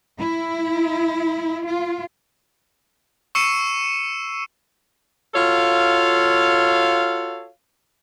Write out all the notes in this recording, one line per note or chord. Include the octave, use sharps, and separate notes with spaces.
E4
F4
C#6 E6 C7 C#7 D#7 E7
F4 F#4 A4 C#5 F5